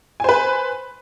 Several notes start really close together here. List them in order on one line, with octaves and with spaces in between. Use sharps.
G#5 C5 B4